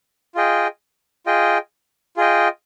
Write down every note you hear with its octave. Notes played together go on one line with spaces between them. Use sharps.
F4 G#4 D#5 G5
F4 G#4 D#5 G5
F4 G#4 D#5 G5